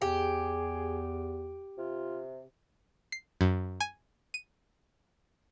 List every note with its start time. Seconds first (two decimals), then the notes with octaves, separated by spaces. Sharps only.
0.02 E2 G4 G#4
1.78 C3 F4
3.12 C7
3.41 F#2
3.80 G#5
4.34 D#7